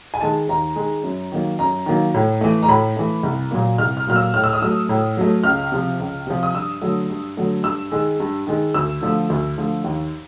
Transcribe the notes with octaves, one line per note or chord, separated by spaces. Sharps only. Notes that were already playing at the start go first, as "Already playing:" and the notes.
G#5
D#3 G#3 A5
D#2 A#5
D#3 G#3
F#2
D#3 F#3 A#3
F#2 A#5
D#3 F#3 A#3
A2
E3 A3
A#5
A2 B5
E3 A3
C2
A#2 F#3 A#3
C2 F6
F6
A#2 F#3 A#3 F6
E6
A2 F6
E6
D#6
F#3 A3 E6
A2
F#3 A3
C#2 F6
C3 F3
C#2
C3 F3
D#6
G2 E6
D3 F#3 A3
G2
D3 F#3 A3
G2 E6
D#3 G#3
G2
D#3 G#3
D2 E6
D3 F3 A3
D2
D3 F3 A3
D#2